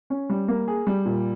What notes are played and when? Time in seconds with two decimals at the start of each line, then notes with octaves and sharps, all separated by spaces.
0.10 C#4
0.30 G3
0.48 A#3
0.67 G#4
0.87 G3
1.05 A#2